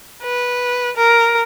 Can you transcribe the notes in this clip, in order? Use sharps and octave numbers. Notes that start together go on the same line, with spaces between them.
B4
A#4